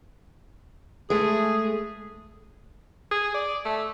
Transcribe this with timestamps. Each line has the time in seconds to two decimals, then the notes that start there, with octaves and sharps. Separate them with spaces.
1.10 G#3 A3 G#4
3.11 G#4
3.34 D5
3.65 A3